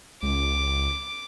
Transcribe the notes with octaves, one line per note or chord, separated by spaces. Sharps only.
C#2 D6